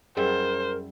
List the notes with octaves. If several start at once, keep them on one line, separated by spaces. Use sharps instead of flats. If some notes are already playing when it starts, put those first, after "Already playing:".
F#2 G3 E4 G#4 A#4 C5